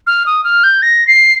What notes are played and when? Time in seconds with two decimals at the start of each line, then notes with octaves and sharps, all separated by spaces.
0.07 F6
0.26 D#6
0.44 F6
0.64 G6
0.82 A#6
1.07 C7